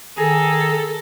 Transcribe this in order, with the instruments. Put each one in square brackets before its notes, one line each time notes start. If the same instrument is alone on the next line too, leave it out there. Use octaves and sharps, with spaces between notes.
[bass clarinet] D#3 [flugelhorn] G#4 [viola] A4 [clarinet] A#5